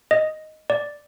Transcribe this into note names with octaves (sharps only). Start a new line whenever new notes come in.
D#5
D5